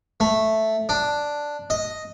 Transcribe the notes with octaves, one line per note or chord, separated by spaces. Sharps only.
A3
D4
D#5